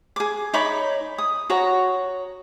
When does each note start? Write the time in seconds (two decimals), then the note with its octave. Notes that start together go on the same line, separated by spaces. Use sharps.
0.16 G#4 D6
0.53 D#4 C#5 B5 D6
1.18 D#6
1.50 F#4 C#5 A#5